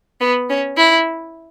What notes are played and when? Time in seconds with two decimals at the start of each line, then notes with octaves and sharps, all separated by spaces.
0.21 B3
0.49 C#4
0.77 E4